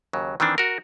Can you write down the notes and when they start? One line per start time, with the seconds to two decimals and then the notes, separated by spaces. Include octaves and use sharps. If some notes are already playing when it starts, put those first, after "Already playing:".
0.13 D#2 C#3 F#3
0.40 D#3 E3 C4 D4
0.58 F#4 A#4